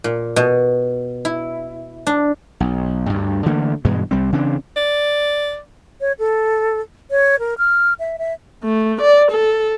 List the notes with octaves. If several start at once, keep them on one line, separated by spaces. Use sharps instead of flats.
A#2
B2
E4
D4
B1
D2 G2
D3 E3 A3 A#3
G2 B2 E3 G#3
C2 G3 C4
C#3 E3 C4 D4
D5
C#5
A4
C#5
A#4
F6
E5
E5
A3
D5
A4